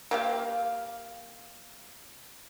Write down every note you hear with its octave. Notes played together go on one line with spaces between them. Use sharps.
A#3 G4 F5